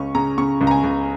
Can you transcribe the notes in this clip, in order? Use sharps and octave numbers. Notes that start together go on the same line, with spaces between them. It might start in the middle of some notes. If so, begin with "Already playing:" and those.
Already playing: C#2 C#4 C#6
C#3 A#5
C#3 C#6
C#2
A#5
G#5
C#2